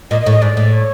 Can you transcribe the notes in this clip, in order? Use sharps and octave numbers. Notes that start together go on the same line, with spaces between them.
A#2 D#5
D#5
A2
D#5
G#2 D5
A2
C#5